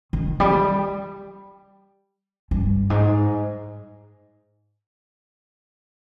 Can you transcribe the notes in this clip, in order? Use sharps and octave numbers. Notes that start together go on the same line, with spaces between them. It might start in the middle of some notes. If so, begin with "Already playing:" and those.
D#3
G3
G2
G#2